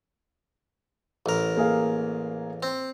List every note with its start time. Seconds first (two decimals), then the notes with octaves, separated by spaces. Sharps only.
1.26 A1 A#4
1.57 A#3 G#4 F5
2.63 C4